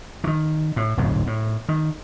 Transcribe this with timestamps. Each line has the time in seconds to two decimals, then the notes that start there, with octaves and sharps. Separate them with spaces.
0.24 D#3 E3
0.76 A2
0.97 D1 B1 F2 G#2
1.27 A2
1.69 D#3